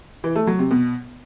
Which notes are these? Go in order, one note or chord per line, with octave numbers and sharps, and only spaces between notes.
E3
A3
F#3
C3
B2